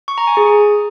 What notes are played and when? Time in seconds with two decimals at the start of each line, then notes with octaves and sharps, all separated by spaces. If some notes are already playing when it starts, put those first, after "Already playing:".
0.08 C#6
0.18 A#5
0.27 G#5
0.37 G#4